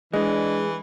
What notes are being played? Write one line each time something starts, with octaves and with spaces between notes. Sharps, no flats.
E3 G#3 D4 D#5